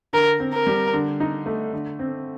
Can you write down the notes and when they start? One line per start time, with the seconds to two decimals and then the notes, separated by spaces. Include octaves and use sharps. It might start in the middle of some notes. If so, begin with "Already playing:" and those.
0.13 D3 A#4
0.40 C4
0.54 A#4
0.67 G3
0.93 D3
1.20 D#4
1.46 A3
1.73 D3
1.99 C4